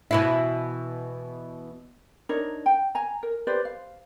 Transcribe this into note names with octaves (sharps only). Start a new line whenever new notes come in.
B2 E3 E4
D4 D#4 A#4 C#5
G5
G#5 A#5
A#4
G4 B4 C5 D5
F5